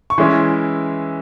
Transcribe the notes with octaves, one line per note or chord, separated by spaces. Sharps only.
C#6
E3 G#3 C#4 E4 C6